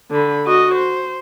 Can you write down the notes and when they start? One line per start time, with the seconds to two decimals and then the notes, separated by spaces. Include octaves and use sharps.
0.11 D3 B5
0.46 F#4 D#5
0.75 C5